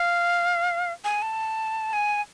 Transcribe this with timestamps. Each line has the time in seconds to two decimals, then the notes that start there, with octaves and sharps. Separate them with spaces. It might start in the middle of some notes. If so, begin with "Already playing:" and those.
Already playing: F5
1.04 G#5
1.22 A5
1.93 G#5